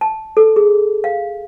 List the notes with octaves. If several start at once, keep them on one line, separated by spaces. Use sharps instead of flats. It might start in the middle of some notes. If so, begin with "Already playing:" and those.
A5
A4
G#4
F5